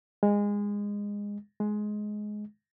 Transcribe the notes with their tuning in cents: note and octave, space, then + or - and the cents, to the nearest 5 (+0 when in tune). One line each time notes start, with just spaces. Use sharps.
G#3 -20
G#3 +15